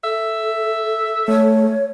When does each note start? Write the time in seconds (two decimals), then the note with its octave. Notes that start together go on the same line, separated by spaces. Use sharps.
0.04 A4 E5
1.28 A3 C#5